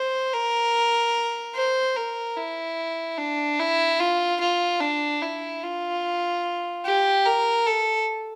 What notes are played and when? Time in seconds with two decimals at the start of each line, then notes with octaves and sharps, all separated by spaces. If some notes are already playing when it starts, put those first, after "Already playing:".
Already playing: C5
0.33 A#4
1.56 C5
1.96 A#4
2.37 E4
3.18 D4
3.59 E4
4.00 F4
4.41 F4
4.80 D4
5.22 E4
5.63 F4
6.85 G4
7.26 A#4
7.66 A4